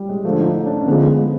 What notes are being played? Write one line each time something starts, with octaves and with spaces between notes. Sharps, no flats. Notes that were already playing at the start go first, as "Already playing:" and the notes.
Already playing: G3
G#3
D2 D3 F3 A3
D#4
D#4
D4
C#4
D3 F3 G#3 B3
G#3